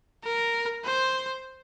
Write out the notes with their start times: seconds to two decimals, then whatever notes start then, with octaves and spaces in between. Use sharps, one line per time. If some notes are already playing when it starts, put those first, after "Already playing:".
0.24 A#4
0.85 C5